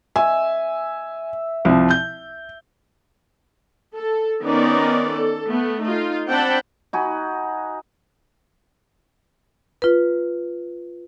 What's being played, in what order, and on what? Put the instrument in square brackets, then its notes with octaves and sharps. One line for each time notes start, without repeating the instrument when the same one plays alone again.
[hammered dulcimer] E5 [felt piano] G#5
[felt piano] C2 F3
G6
[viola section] A4
D#3 B3 C#4 D#4 A#4 D5
A4
A3 B3
D#4 F4
C4 D4 F#5 G5 A5 B5
[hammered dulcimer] D#4 F#4 G#5 B5
[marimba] F4 B4